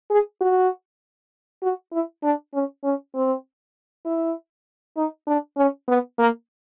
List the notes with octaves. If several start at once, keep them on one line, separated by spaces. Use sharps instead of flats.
G#4
F#4
F#4
E4
D4
C#4
C#4
C4
E4
D#4
D4
C#4
B3
A#3